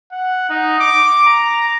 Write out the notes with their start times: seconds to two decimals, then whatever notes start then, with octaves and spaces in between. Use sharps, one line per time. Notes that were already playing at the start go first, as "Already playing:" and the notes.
0.12 F#5
0.50 D#4
0.80 D6
1.27 A#5